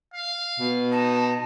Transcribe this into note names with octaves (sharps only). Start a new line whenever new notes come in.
F5
B2
D#4 A5